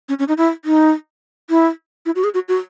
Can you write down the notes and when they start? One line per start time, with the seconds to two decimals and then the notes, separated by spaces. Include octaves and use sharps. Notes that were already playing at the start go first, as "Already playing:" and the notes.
0.09 C#4
0.19 C#4
0.28 D#4
0.38 E4
0.65 D#4
1.50 E4
2.06 E4
2.15 F#4
2.24 G#4
2.34 F#4
2.48 F#4